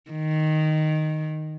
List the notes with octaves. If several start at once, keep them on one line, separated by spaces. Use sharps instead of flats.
D#3